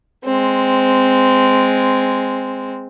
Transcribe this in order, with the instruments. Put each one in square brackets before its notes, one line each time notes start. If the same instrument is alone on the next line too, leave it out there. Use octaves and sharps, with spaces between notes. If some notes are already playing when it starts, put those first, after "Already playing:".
[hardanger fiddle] G#3 C4